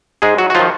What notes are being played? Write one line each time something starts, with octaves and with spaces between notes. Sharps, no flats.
G#2 G#3 G#4
F#3 F#4
F#4
D#3 F3 F#3 F4